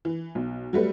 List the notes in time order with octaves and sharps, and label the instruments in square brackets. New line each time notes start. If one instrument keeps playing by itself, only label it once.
[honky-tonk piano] E3
B1
F#3 G3 A3 B4